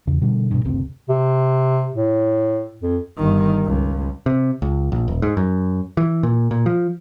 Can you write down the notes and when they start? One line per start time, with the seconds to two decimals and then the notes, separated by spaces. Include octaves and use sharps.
0.07 E2 C#3
0.22 B2 D3 G3
0.51 G2 B2
0.65 F#1 D2 C3 C4
1.09 C3
1.95 A2
2.82 F2
3.17 G1 D#3
3.65 C#2
4.26 C3
4.62 C#2
4.92 A#1
5.08 D#1
5.22 G#2
5.37 F#2
5.97 E3
6.23 A#2
6.51 A#2
6.66 F3